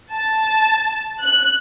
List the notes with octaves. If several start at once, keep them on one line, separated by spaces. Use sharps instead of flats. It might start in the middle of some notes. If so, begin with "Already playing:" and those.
A5
F#6